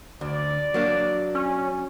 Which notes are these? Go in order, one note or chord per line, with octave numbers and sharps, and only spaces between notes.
D2 D5
F#3 A#3 D4
C#4